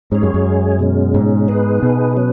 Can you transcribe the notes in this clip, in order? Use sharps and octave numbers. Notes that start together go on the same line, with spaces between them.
G#2 G#3 C#4 G#4 C#5
F#2
F#2
B2 G#3 C#4
G#2
B3 D#4 G#4 B4
B2
F#3 C#4 B4